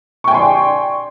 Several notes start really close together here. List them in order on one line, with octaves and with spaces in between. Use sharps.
C#6 G5 G#5 C6 D5